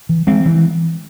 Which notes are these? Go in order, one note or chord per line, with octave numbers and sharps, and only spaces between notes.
E3
G#3 C4
E3